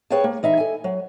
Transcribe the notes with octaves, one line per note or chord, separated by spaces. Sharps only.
G#4 B4 C#5 F5 G5 A5
A#3
E3 D#4 E5
A4 G#5
F#3